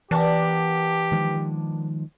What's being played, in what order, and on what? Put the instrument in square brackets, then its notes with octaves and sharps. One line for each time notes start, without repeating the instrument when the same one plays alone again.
[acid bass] E3 [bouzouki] B3 D4 A#4 [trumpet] G4
[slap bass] D#3 F3 G#3